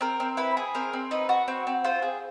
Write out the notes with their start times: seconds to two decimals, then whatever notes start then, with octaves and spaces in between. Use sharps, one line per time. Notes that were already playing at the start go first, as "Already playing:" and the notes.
0.01 C4 A#4
0.20 C4
0.37 E4 B4
0.57 G#4
0.75 C4 A#4
0.93 C4
1.11 D#4 B4
1.29 F#4
1.48 C4
1.67 C4
1.84 F4 C5
2.02 G#4